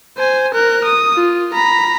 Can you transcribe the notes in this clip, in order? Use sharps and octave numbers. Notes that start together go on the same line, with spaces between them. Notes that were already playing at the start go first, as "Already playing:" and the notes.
C5 G#5
A#4 F#6
D#6
F4
A#5 B5